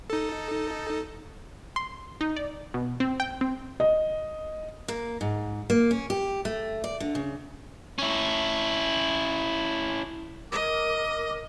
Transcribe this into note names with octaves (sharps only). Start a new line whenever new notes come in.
D#4 A4
C6
D#4
D5
B2
C4
G5
C4
D#5
A#3
G#2
A#3
C#4
G4
A3
D5
D3
C#3
C#4 E4
A#4 D#5 D6